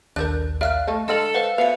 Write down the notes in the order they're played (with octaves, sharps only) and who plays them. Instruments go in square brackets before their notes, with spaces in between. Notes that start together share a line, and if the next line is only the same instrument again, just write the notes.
[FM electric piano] A#1 D#2 [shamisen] D4 A4 A#4 [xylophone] F#6 G6
[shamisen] A#4 D5 E5 [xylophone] F5 F6 F#6
[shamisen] A3 A4 D#5
[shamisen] D3 F#5 A#5 [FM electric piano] G#3 [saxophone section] A4 [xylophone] D#5 F6 F#7
[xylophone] B4 C5 F5 [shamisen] F#5
[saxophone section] B2 B3 [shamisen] E5 F5 [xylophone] C#7 F7